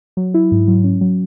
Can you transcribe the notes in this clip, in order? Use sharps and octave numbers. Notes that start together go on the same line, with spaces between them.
F#3
E4
G#2
F#3
C#4
F#3